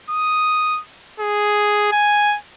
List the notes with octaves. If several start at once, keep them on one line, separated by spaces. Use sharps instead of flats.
D#6
G#4
G#5